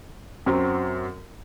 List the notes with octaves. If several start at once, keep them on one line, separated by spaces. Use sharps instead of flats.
F#2 F#3 C4